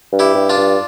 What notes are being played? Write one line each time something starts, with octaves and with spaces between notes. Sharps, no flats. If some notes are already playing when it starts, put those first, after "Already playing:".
G2
E4 G4
G2
D4 F4
G2